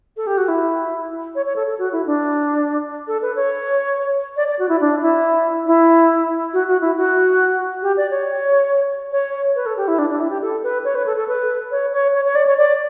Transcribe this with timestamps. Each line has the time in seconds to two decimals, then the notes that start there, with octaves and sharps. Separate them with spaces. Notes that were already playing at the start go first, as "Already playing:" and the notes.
0.17 A4
0.27 G4
0.38 F#4
0.48 E4
1.35 C#5
1.46 C#5
1.56 A4
1.67 A4
1.79 F#4
1.92 E4
2.06 D4
3.08 A4
3.22 B4
3.36 C#5
4.37 D5
4.48 D5
4.59 F#4
4.69 E4
4.81 D4
5.02 E4
5.67 E4
6.53 F#4
6.67 F#4
6.81 E4
6.97 F#4
7.82 G4
7.97 D5
8.11 C#5
9.12 C#5
9.55 B4
9.66 A4
9.77 G4
9.88 E4
9.99 D4
10.10 D4
10.20 E4
10.30 G4
10.42 A4
10.63 B4
10.85 C#5
10.95 B4
11.06 A4
11.17 A4
11.28 B4
11.71 C#5
11.93 C#5
12.14 C#5
12.25 C#5
12.35 D5
12.47 C#5
12.58 D5